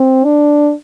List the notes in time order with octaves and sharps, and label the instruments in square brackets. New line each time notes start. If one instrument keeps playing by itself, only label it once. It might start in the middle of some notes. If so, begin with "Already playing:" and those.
Already playing: [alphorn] C4
D4